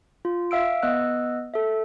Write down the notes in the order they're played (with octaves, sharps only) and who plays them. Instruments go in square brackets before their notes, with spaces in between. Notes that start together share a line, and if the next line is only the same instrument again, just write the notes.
[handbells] F4
E5 F5 E6 D7
B3 D#5 E6 F#6
A4 E5